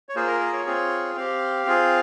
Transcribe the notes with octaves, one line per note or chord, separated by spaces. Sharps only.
C#5
A#3 F4 G#4 C5
A#4
A#4
C#5
C4 F4 G#4
C4 G4 F5
C4 F4 G#4